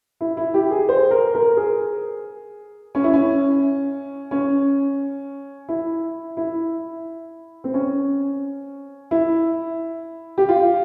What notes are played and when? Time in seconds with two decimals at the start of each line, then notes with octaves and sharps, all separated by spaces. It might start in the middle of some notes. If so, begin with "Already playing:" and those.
0.21 E4
0.37 E4
0.54 G4
0.71 G#4
0.89 C5
1.11 A#4
1.35 A#4
1.57 G#4
2.95 C#4
3.04 E4
3.14 C#4
4.31 C#4
5.69 E4
6.37 E4
7.64 C4
7.74 C#4
9.11 E4
10.38 G4
10.49 F4